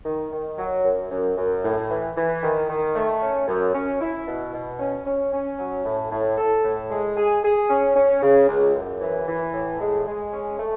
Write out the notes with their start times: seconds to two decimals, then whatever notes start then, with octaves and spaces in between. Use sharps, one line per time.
0.05 D#3
0.32 D#3
0.58 F#3
0.85 F#2
1.11 F#2
1.37 F#2
1.64 A2
1.90 E3
2.17 E3
2.43 D#3
2.70 D#3
2.96 A3
3.22 C#4
3.48 F#2
3.75 C#4
4.01 E4
4.27 B2
4.54 B2
4.80 C#4
5.06 C#4
5.33 C#4
5.59 F#3
5.85 A2
6.12 A2
6.38 A4
6.64 A2
6.91 G#3
7.17 G#4
7.43 G#4
7.70 C#4
7.96 C#4
8.23 C#3
8.49 C#2
8.75 F#2
9.01 E3
9.28 E3
9.54 A2
9.81 G#3
10.07 G#3
10.33 C#4
10.59 A3